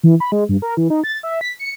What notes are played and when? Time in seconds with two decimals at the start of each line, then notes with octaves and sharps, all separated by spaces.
0.04 E3
0.20 B5
0.32 G#3
0.49 G2
0.62 A#4
0.77 E3
0.90 D#4
1.04 A6
1.23 E5
1.41 B6
1.59 C#7